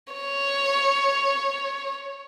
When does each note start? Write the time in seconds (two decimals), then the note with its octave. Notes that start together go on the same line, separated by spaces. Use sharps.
0.13 C#5